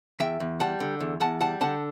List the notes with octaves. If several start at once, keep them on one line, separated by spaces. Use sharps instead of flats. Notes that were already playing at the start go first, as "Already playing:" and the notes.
E2 E5 G5
E2
G3 F#5 A5
D3
E2
E2 F#5 A5
G3 F#5 A5
D3 F#5 A5